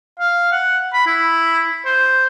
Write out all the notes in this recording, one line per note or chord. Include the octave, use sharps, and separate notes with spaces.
F5
F#5
B5
E4
C5